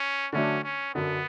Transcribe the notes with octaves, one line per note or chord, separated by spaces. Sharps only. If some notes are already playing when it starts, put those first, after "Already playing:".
Already playing: C#4
D3 F#3 A3 C#4 D4
C#4
F#2 D3 F#3 B3